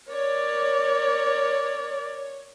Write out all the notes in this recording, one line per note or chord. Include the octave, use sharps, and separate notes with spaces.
A#4 C#5 D5